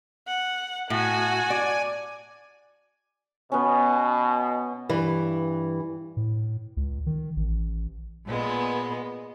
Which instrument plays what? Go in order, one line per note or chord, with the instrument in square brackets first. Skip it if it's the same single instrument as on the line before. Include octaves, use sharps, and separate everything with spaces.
[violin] F#5
[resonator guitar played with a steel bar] A2 [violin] F#4 [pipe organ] G#5
[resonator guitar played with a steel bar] D5
[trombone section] B2 [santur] B3 C#4
[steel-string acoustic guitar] G2 E3
[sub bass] A2
C#2
D#3
A1
[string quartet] A#2 G#3 B3